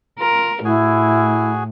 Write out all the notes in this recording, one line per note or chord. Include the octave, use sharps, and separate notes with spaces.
F4 A#4
A2 E4 F#4 G#4 G#5